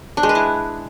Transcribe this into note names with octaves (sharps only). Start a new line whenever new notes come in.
D4
G#3
B4
E4